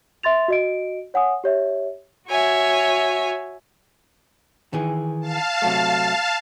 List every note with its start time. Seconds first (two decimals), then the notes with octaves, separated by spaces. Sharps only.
0.23 E5 C6 A6 F7
0.48 F#4 D#5 D7
1.14 C#5 F#5 G#5 D#6
1.44 G4 C#5 E5
2.28 F#4 C#5 E5 G#5
4.73 D#3 E3 G#4
5.21 F5 A5
5.62 C3 F#3 A3